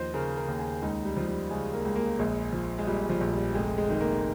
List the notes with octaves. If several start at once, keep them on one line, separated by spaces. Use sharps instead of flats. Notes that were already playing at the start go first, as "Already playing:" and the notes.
Already playing: D#2 F3 C5 D#5
C#3 A#4
A#4
D#2
G#4
C#2 D#4
G3
F3
G3
C#3 G#3
A#3
C#2
A#3
A#1 G#3
F3
G#3
A#2 G3
F3
A#1
G3
F1 G#3
G#3
D#3 G#3
A#3